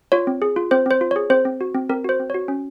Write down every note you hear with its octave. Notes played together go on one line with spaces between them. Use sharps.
F4 C#5
C4
G#4
F4
C4 C5
C4 C5
F4
C#5
G#4
C4 C5
C4
F#4
C4
C4 A#4
F#4 C5
C4
F#4 C#5
C#4